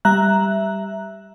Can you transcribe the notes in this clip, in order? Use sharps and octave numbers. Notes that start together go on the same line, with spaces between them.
G3 E5 A#5 F#6